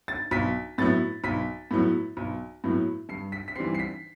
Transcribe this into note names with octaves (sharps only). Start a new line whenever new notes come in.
A6
B1 B6
A2 F#3 B3 E4 A6
B1 B6
A2 F#3 B3 E4
B1
A2 F#3 B3 E4
G2 C7
B6
B6
E3 G3 C4 C7
C7
B6